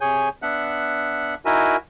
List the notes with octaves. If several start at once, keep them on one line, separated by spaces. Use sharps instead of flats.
C3 G#4 C#5 G#5 G6
B3 D4 E5 F#5 F#6
D#4 E4 F#4 A#4 E5 G#5